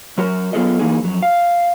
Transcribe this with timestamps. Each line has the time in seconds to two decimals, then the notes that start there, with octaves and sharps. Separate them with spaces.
0.18 F#3 F#4 A#4
0.53 F#3 B3 F4 G#4 A4 D#5
0.79 E3 A#3 D#4 G#4
1.02 F2 F#3
1.22 F5